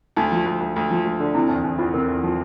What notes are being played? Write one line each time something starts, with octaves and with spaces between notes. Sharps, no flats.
D2 D#4
F3
D2
D2
D2
F3
D2
D3
C3 E4
E2 D#4
E2 D#4
E2 F4
C3 A#4
E2
F3